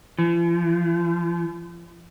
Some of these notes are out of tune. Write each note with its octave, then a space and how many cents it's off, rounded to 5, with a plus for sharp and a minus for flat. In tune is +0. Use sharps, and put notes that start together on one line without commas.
F3 -40